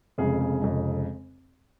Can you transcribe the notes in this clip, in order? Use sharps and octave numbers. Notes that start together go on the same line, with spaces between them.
F1 F2 C#3 G#3 G#4
G#4
F1 F2 C#3 G#3